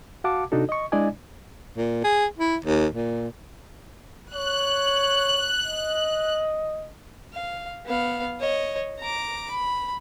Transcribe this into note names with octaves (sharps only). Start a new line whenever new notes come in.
F#4 F5 F#5 A5 D6
C3 D4 D#4 F#4 A4
D#5 C#6
G#3 D4 E4 D5 D#5 G#5
A#2
G#4
E4
D#2
A#2
C#5 F#6
D#5
F5
B3 F5
C#5 D#5
A#5 D6
B5